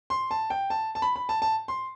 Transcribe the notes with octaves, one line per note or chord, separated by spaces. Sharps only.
C6
A5
G5
A5
A5
B5
B5
A5
A5
C6